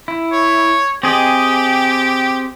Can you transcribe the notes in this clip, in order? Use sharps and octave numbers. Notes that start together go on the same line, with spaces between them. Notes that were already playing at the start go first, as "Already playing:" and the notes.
E4
C#5
C4 G4 G#4 D#5